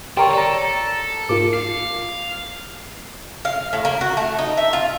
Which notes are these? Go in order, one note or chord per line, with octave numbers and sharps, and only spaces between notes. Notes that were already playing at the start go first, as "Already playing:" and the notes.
G4 A4 A#4 C#5 D5 C6
A4 D5 A#5
G#2 A#3 F4 D6
F5
F5
A2
A#3
F#4
A3
D#4
E5
F4